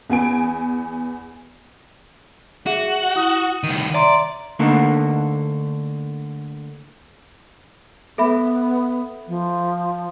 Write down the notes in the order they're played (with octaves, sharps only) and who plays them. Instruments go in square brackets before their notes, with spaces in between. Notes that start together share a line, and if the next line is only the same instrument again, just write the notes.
[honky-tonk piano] E2 B3 G#5 D7
[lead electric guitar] F#4 [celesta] G#4 E5 F#5
[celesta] E4 D#6 F#7
[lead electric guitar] C2 D#3 [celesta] D#7
[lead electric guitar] D5 [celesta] E5 A#5 C6
[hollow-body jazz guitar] D3 A3 A#3 D#4
[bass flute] B3 [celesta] A4 E5 B5
[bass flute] F3